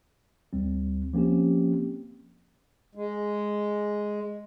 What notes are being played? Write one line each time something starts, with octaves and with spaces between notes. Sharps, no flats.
D2 G3 C4
F3 A#3 C4 C#4 G4
G#3